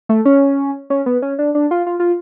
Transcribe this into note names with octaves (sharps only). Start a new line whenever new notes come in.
A3
C#4
C#4
B3
C#4
D4
D4
F4
F4
F4